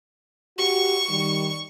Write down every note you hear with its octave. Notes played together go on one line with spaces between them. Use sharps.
F#4 G4 C#6
D#3 G3